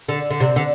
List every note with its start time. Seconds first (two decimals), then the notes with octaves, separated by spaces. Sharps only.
0.08 D3
0.30 D3
0.40 C3
0.56 D3